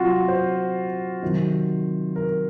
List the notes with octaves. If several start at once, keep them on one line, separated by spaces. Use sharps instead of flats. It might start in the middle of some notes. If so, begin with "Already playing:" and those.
Already playing: C3 F#3 F4 F#4
C5
C3 D#3 F#3
A#4